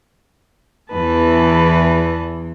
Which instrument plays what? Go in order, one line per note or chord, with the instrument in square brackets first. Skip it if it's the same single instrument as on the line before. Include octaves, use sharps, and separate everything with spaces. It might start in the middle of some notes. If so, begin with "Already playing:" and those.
[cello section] E2 E3 [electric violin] B4 A5